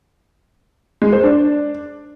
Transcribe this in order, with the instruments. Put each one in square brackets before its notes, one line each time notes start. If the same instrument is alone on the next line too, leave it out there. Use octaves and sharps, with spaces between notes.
[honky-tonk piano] G#3
C5
D4